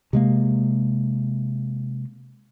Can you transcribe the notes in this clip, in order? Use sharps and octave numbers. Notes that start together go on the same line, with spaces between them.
C3 G#3 A#3